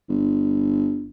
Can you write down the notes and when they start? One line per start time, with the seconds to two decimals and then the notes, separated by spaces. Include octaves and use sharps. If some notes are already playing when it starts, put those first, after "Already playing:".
0.09 G1